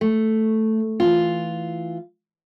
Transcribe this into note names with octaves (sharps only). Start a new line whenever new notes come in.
A3
E3 F4